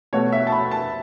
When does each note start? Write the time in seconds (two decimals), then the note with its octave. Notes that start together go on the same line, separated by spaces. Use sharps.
0.13 B2 A3 F#4 C#5
0.32 E5
0.47 A5
0.52 B5
0.71 A5